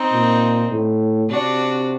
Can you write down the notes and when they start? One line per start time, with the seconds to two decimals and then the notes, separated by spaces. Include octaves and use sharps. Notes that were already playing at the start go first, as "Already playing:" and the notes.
Already playing: C4 D#4
0.13 A#2
0.71 A2
1.30 C3 D4 F#4